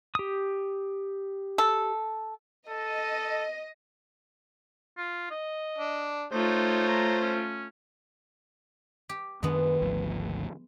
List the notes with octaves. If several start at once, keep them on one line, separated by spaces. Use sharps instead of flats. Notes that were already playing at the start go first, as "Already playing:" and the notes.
G4 D#6
A4
A4 D#5
F4
D#5
D4
A3 D#4 F4 C5 C#5
A#5
C#4
G4
F#2 D#3 G#3 B3 D4
G#1 D2 F3